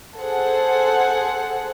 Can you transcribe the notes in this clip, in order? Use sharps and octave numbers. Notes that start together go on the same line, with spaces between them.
G#4 A4 C5 F#5